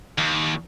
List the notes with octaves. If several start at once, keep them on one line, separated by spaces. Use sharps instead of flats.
D#2